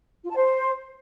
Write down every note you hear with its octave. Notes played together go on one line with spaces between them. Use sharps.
F4
A5
C5